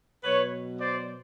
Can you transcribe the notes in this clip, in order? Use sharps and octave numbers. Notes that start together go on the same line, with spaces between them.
B2 F#3 B4 C#5
C5 D5